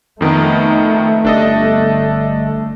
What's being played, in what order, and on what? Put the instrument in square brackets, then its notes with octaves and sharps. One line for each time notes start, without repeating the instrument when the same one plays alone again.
[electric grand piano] F2 D#3 B3 [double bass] A3 [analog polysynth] D#4
[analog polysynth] G1 [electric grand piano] D4 A4 D#5